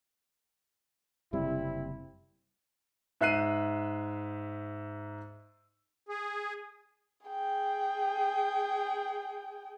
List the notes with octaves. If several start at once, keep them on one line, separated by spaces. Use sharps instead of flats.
F#1 C3 G3 C4 E4
G#2 E5 F#6 C7 D#7
G#4
G#4 G5